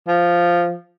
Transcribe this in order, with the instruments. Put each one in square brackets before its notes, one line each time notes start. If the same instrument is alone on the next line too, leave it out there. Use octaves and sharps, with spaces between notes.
[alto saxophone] F3